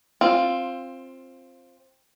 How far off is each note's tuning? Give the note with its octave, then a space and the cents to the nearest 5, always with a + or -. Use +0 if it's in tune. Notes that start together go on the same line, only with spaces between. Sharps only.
C4 +15 F4 +0